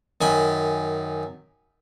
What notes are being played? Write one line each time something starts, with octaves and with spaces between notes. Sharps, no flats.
F#2 D#3 G#5 B5